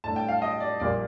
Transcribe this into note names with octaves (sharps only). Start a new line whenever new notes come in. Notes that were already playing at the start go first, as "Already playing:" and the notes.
A2 A3 D4 A5
G5
F5
D#5
D5
A#1 A#2 G3 A#3 D5